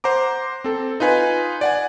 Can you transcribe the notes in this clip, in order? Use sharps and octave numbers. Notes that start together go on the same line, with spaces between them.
C5 F#5 A#5 D6
C4 A4
D#4 F4 B4 G#5
D5 F#5 G#5